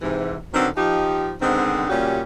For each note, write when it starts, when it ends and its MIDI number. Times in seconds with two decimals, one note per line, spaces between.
0.02 0.37 44
0.02 0.37 48
0.02 0.37 52
0.53 0.68 50
0.53 0.68 51
0.53 0.68 54
0.53 0.68 59
0.53 0.68 60
0.77 1.33 53
0.77 1.33 63
0.77 1.33 67
1.41 1.85 50
1.41 1.85 51
1.41 1.85 56
1.41 1.85 59
1.41 1.85 60
1.89 2.22 46
1.89 2.22 49
1.89 2.22 55
1.89 2.22 61
1.89 2.22 66
1.89 2.22 67